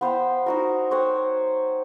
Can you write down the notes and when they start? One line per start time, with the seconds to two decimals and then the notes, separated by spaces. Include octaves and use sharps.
0.01 B3 C5 F5 G5
0.46 D#4 F#4 A#4
0.91 C5 C#5 F#5 G5